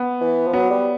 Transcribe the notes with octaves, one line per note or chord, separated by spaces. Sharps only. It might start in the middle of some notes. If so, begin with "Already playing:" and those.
Already playing: B3
E3
F3
F#3 B3
G3